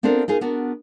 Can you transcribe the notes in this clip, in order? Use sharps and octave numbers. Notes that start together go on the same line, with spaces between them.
B3 C4 D4 F4 A4 A#4
D#4 F4 G#4 A#4
B3 D4 F#4 A#4